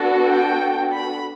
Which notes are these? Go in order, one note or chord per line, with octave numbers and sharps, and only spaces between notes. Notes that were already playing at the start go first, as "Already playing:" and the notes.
Already playing: B3 D4 F#4 A4
G5
B5